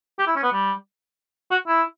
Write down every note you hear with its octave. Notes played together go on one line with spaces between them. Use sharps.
G4
E4
C#4
B3
G3
F#4
E4